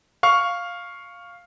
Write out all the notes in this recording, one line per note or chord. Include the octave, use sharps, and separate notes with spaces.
F5 C#6 F6